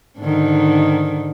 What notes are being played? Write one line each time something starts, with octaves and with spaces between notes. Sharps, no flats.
G#2 D3 D#3